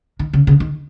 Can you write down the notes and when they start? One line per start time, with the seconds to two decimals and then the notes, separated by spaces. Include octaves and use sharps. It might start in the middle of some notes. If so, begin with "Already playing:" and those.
0.19 D#3
0.33 C#3
0.47 C#3
0.60 D#3